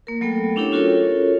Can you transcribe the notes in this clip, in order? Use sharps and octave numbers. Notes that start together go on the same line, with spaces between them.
A#3 A#4
F#3 A3 B3 A4 G5
C#4 D4 E4 G4 A4 C#5
C#4 F4 F#4 A4 A#4 C#5